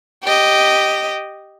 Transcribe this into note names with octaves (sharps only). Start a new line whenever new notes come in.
G4 D#5